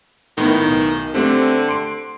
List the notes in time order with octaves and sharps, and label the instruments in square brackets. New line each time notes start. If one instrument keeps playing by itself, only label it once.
[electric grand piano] A2 B3 [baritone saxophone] D#3
[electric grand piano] B1
[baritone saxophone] D3 [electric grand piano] A3 C4 G4
[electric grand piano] C6 D7